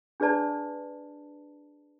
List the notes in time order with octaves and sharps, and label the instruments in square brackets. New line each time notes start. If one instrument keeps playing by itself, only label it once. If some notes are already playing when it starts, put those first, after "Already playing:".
[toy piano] D4 G#4 B4 D5 A5